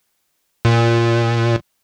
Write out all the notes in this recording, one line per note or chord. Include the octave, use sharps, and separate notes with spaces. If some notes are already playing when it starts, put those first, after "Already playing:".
A#2